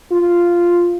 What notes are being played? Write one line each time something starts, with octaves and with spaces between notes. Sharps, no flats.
F4